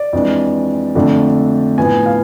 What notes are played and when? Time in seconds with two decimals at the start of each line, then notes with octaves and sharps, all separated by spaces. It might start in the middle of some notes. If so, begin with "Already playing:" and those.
Already playing: D5
0.13 F2 E3 G#3 D4
0.95 F2 D3 F3 A3 D4
1.78 A2 F3 B3 D4 G#5
2.06 F5